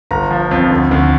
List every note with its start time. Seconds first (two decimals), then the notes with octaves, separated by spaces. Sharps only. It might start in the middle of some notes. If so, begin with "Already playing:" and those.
0.11 G1 A#5
0.31 F3
0.51 F2
0.71 D2
0.91 D2